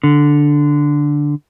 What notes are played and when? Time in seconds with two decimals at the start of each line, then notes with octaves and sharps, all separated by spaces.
0.04 D3